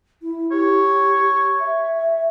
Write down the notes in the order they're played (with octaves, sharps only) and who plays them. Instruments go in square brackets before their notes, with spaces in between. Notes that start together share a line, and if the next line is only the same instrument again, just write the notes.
[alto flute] E4
[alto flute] G4 [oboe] C#5
[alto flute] E5